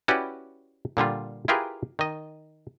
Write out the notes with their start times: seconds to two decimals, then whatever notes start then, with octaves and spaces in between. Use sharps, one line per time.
0.08 C#4 E4 F#4 G4 B4 D5
0.97 A#2 D3 G3 F4
1.48 E4 F4 G4 G#4 A#4 B4
1.99 D#3 D#5